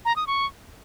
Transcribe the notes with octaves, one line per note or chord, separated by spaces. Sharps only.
A#5
D#6
C#6